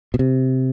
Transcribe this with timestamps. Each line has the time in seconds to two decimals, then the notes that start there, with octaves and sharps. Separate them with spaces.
0.14 B2
0.19 C3